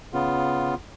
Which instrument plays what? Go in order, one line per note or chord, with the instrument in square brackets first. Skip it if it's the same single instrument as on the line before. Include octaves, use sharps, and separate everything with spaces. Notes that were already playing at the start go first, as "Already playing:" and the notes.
[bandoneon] C#3 B3 F4